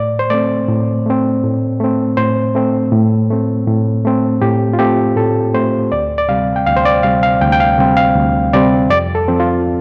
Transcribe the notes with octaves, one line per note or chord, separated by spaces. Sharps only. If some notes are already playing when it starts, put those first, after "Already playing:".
Already playing: A2 D5
C5
A3 C4 D5
A2
A3 C4
A2
A3 C4
A2 C5
A3 C4
A2
A3 C4
A2
A3 C4
A2 G4
F4
A3 C4 G4
A2 A4
A3 C4 C5
D2 D5
D5
C3 G3 C4 F5
G5
D2 F5
C5
D5
C3 G3 C4 F5
F5
D2 G5
G5
F5
C3 G3 C4
F5
D2
C3 G3 C4 D5
F2 D5
A4
F3 C4
F4